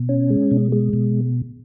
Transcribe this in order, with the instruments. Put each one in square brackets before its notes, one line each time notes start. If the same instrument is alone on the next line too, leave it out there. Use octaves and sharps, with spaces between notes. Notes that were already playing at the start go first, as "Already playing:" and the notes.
Already playing: [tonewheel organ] B2
C#4
G#3
B2
G#3
B2